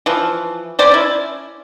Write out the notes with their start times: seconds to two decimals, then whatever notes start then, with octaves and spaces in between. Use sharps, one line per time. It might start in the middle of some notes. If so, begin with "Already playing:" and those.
0.06 E3 F3
0.79 C#4 C5 D5
0.92 C#4 E4